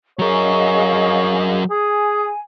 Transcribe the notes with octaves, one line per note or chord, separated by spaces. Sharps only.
F#3 G#4 A#4 C#5 D#5 F5
G#4 G#5